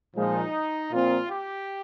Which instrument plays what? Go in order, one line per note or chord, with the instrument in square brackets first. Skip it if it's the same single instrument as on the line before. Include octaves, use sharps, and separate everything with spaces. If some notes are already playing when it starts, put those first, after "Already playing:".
[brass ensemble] A#2 F3 G#3 D#4
A#2 F3 C4 F4
G4